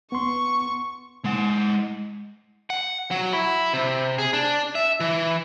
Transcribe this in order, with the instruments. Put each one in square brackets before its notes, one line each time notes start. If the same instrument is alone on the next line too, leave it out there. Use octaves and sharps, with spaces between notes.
[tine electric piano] B3 C6 [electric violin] C#6
[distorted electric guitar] G#3 F#5
[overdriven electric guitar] F#5
F#3
E4
C3
G#4
D4
E5
E3